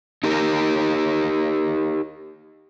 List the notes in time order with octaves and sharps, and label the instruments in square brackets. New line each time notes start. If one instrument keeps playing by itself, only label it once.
[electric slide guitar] D#4 G4 A#4